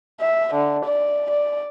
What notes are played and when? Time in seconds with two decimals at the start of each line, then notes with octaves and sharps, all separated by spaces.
0.20 E5
0.54 D3
0.85 D5
1.30 D5